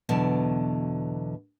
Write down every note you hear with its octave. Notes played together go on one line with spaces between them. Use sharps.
E2 B2 D3 F#3 A5